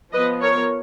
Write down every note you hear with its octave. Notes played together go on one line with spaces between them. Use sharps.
F3 B3 B4 D#5
A#4 C#5